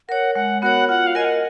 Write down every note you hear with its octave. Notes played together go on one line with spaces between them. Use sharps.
A#4 C#5 F#5
G#3 F#5
B3 F#4 A#4 C#5 F#5
F4 F#5
F5
A#4 D#5 G#5
F#5